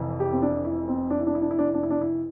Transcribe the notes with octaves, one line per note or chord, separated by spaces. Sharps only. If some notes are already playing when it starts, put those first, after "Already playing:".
Already playing: F1 F2 E3
G4
C4
D4
E4
C4
D4
E4
D4
E4
D4
E4
D4
E4
D4
E4
D4
E4